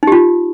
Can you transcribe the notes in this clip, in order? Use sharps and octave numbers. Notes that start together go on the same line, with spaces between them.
D#4 F4 G4